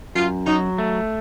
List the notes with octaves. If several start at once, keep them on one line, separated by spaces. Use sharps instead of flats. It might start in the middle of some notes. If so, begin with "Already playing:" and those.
F#2 F4
F#3 D#4
A3